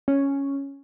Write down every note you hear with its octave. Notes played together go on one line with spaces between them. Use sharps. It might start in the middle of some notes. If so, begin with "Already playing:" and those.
C#4